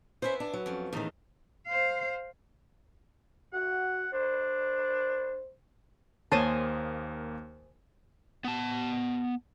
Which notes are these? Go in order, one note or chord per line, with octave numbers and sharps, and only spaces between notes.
B3 C#4 E4 C5 E5
D4
F#3
F2 C#4
E2 A2 D#3 D#4
C5 F5
F#4 F#5
D4 C5
D#2 A#3 C5 C#5 D#5 G#5 A5
B3 A5